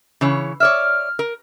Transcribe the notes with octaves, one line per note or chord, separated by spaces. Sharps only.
C#3 E3 C#5
C#5 D5 E5 F6
A#4